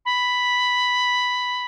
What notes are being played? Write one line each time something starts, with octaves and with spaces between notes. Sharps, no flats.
B5